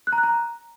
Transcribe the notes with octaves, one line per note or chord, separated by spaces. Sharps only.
F#6
A#5
F#6
A#5